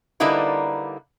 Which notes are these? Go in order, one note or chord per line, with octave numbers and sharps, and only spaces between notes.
D3 G3 A#3 D#4 E4 B4